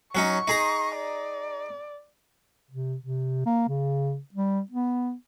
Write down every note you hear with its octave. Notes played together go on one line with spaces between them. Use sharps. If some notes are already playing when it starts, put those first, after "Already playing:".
F#3 C#4 D#4 C#6
D#4 G#4 A#5
D5
C3
C3
A#3
C#3
G3
B3